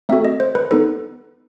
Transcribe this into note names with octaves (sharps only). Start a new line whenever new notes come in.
A3 C4 F#4 A4 E5
D#5
C5
B4
B3 D#4 A4 B4